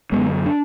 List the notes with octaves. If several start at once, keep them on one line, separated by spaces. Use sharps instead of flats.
F#2 D3 G#3 B3
D4